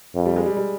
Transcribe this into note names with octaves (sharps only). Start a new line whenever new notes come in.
F2
G3
G#3
G3
G3